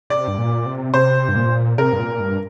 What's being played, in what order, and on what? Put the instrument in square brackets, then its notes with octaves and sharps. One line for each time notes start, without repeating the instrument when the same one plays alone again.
[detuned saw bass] C3 [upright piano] D5
[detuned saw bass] G2
A#2
C3
[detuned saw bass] C3 [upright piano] C5
[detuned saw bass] G2
A#2
[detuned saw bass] C3 [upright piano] A#4
[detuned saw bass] G2
A#2
G2